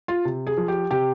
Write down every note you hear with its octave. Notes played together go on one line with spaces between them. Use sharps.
F4
C3
G#4
F3
G4
C3 G4